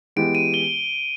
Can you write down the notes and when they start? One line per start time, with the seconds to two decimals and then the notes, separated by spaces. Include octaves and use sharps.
0.16 E3 G#3 B3 E4 G4 D7
0.35 D#7
0.54 G7